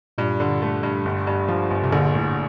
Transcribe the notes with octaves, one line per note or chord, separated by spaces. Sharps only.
G2 A#2
D3
A3
G2
G1
G2
F3
G1
C3
A#1 D3
A2